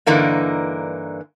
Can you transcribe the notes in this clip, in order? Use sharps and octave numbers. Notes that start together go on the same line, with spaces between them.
G2 D3 E3 A#3 D#4